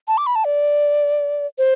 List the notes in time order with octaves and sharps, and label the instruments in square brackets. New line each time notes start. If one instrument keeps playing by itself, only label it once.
[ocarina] A5
D6
B5
A5
D5
C5